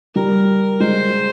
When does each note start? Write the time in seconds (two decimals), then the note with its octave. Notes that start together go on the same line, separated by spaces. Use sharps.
0.15 G3 A#4
0.80 G#3 C5